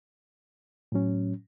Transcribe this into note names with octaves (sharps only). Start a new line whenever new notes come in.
A2 F#3 C#4